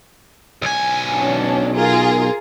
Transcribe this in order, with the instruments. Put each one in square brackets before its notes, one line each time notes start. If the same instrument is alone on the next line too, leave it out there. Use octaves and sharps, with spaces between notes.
[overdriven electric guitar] B1 G#5
[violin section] C#4 D4
F4 G#4 A#4